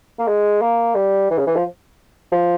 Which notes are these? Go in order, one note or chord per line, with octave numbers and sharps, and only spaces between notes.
A#3
G#3
A#3
G3
E3
C#3
E3
F3
F3